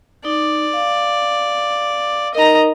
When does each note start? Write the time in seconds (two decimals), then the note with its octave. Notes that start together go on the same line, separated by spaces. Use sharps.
0.25 D#4 D5
0.73 F5
2.35 D#4 A#4 D#5 A#5